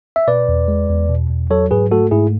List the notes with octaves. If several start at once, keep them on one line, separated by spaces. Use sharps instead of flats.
E5
B2 B4 D5
E2
G#3
E2
B2
E2
F#3 A4 C#5
G#2 G#4 B4
A3 F#4 A4
G#2 E4 G#4